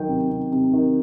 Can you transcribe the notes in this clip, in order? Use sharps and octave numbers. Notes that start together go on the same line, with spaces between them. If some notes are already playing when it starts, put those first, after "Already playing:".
Already playing: D#3 F#3 G5
C3
C3
C3
D#3